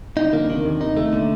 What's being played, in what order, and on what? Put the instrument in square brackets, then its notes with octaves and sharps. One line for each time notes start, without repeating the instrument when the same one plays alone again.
[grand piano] C3 [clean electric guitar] D#4
[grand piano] D3 [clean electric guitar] A#3
[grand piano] C3 [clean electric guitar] D#3
[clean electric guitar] D#2
[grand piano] C3 [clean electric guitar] D#4
[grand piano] C3 [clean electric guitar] A3
[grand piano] A#2 [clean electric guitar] D3